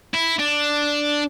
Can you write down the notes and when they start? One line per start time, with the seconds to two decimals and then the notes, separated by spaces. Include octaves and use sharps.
0.14 E4
0.39 D4